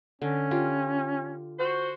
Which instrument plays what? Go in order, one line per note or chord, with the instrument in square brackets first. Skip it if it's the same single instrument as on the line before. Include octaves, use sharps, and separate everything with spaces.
[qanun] D3 [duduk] C#4
[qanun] F4 G4
[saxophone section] F#4 C5